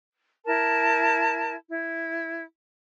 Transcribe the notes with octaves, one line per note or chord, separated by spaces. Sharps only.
E4 A#4 A5
E4